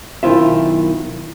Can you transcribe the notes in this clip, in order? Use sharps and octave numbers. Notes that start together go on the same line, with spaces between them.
B1 D#3 E4 F4 E5